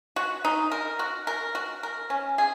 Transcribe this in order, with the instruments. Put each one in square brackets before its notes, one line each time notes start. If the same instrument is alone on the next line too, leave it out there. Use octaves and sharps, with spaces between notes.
[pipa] F#4
D#4
A#4
F#4
A#4
F#4
A#4
C#4
G#4